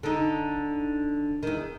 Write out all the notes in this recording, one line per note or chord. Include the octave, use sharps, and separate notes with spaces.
D3 D#4
E2 D#3